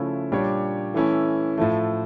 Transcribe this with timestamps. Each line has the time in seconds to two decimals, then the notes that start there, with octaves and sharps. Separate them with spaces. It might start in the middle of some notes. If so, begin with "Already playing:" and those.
Already playing: C#3 F3 A3 C#4 E4
0.31 A#2 G3 D4 G4 C#5
0.94 E3 A3 C#4 E4
1.58 A2 F3 A3